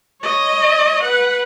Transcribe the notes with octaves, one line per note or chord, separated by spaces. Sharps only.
C#5 D#5
B4 F#5